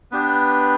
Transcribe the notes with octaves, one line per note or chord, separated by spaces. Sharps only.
B3 D4 G4 B4